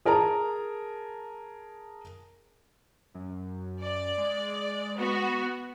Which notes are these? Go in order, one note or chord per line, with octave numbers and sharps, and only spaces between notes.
G#4 A#4 A5 A#5
F#2
D5
G#3
B3 F#4